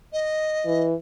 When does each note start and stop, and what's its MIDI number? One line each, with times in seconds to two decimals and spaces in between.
0.13 0.86 75
0.66 0.94 52